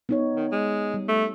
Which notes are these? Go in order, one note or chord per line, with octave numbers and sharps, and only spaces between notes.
B3 D#4 C#5
D#3
G#3
G3
A3